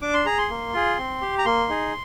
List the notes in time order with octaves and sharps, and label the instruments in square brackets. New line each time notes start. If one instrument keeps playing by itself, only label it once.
[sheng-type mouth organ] D4 D6
C6
G#4 A#5
C6
A#3
F4 G#4
C4
G4
A#5
A#3 C6
D#4 G#4